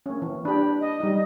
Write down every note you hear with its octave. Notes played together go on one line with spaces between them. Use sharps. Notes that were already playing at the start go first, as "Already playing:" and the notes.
A#3 C#4
E3
D4 G4 B5
D#5
G3 D#4